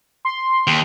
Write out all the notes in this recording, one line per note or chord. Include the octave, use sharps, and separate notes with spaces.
C6
D#2